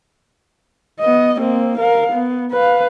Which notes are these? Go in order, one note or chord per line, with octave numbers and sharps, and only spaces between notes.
B3 D#5
A#3 C4
A#4 F5
B3
B4 F5